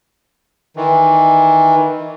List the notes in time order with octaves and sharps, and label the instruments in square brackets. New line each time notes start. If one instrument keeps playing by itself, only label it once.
[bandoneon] D#3 E3